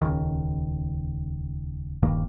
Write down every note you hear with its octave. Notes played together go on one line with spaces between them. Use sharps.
D#1 G#1 C#2 D#3
D#1 G2 D#3 A#3